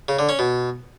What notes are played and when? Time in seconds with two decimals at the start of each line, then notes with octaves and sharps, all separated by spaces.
0.08 C#3
0.19 D3
0.29 C#4
0.39 B2